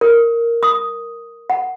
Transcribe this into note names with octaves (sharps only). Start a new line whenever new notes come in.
A#4
D#6
F#5